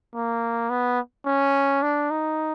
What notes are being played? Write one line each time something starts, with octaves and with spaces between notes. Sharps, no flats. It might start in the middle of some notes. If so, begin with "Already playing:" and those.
A#3
B3
C#4
D4
D#4